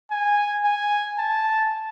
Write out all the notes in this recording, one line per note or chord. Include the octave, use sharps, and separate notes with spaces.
G#5
G#5
A5